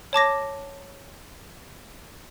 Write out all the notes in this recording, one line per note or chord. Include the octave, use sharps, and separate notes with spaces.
C#5 A5 D6 A#6